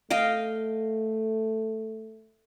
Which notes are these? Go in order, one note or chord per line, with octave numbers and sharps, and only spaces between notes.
A3 D#5 F5 G5